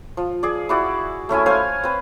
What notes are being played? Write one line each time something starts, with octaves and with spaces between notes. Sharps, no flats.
F3
G#4 D5
E4 F#4 D5
A3 C#4 E4 G#5
C5 C#5 F5 G#5
C4 B4